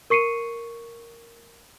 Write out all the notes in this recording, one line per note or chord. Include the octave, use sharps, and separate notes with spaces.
A#4 C#6 C7 C#7 D#7